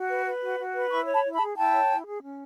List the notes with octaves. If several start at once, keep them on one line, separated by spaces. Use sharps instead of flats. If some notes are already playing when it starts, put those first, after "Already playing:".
Already playing: F#4
B4
B4
F#4
F#4
B4
E4 B5 C#6
C#5
A5 B5
E4
A5 B5
G#4
E4 G5 A5
C#5
E4
G#4
C#4